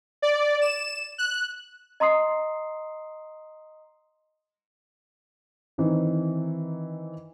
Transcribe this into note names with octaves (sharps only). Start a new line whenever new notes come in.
D5
E7
F#6
D#5 A#5 C6 D#6 C7
D#3 E3 C4 D#4